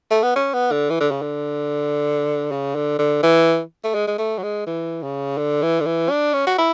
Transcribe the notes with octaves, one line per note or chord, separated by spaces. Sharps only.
A3
B3
C#4
B3
D3
E3
D3
C#3
D3
C#3
D3
D3
E3
A3
G#3
G#3
A3
F#3
G#3
E3
C#3
D3
E3
D3
E3
D4
C#4
F#4
E4